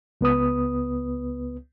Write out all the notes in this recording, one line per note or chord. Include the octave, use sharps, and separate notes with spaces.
C#2 B3 B4 D#6